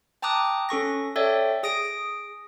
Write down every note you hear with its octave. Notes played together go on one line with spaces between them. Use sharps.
G5 A5 A#5 D6 D#6 F#6
C#4 A4 C#6 A#6
A4 C#5 D5 E5 G5
G#4 D#6 A#6 D7